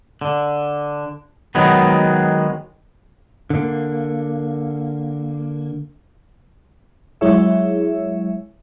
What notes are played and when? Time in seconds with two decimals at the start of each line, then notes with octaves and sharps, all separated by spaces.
0.21 D3
1.55 D#3 F#3 G#3 B3
3.50 D3 A#3
7.21 F#3 G#3 E4 G#4 C#5 E5